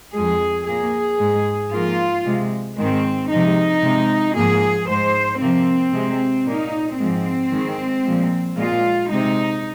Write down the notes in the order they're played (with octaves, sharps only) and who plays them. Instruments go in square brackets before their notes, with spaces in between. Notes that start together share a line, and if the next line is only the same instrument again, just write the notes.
[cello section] F2 F3 G#3 G#4
A#2 A#3 G#4
G#2 G#3
G#2 F3 A#3 F4
C3 G#3
G#2 D#3 G#3 C4
C3 F3 G#3 D#4
C3 G#3
G#2 F3 A#3 G#4
G#2 G#3 C5
C3 F3 A#3 C4
C3 G#3
A#2 A#3 D#4
G#2 F3 G#3 C4
G#2 D#3 G#3
A#2 F3 G#3
A#2 G#3 F4
C3 G#3 D#4